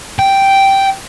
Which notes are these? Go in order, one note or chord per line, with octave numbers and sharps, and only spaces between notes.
G5